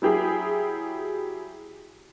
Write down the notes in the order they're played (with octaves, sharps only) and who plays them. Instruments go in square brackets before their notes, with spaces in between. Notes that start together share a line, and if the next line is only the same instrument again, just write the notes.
[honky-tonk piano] F#3 E4 G4 G#4